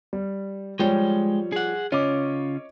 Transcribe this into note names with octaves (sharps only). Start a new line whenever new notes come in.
G3
F3 G3 G#3 C#5 G5
G#4 F#5
C#3 C#4 F4 C#5 D#5 D6